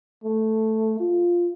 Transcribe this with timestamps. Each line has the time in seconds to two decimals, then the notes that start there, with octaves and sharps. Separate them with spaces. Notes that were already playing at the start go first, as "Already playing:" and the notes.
0.24 A3
1.00 F4